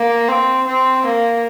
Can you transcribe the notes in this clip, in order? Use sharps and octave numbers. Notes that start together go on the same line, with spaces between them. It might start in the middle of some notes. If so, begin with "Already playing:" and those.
Already playing: A#3
C4
C4
A#3